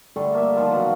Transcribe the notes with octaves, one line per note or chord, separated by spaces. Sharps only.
D3 G3 A3 A4
A#3 E5
D#3 F3 F4 A4
B2 F#3 F#5